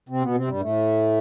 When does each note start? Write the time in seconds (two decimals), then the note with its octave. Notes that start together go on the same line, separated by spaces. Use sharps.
0.09 C3 C4
0.22 B2 B3
0.35 C3 C4
0.47 G2 G3
0.60 A2 A3